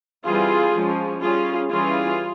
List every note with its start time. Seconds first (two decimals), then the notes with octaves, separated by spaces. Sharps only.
0.24 E3 G3 C4 F4 G#4
0.73 F3 G#3 C#4
1.21 G3 C#4 F4 G#4
1.69 E3 G3 C#4 F4 G#4